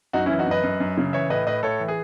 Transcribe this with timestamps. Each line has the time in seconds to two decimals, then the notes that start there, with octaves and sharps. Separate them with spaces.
0.13 F#2 D#4 F#4
0.26 C#4 E4
0.30 E3
0.39 D#4 F#4
0.47 F#2 B4 D#5
0.63 F#2
0.80 F#2
0.98 C#3
1.13 E3 C#5 E5
1.30 A2 B4 D#5
1.46 A2 B4 D#5
1.63 A2 A4 C#5
1.80 E3
1.88 G#4